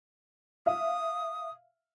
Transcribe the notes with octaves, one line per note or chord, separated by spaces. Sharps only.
E5 F5 D#6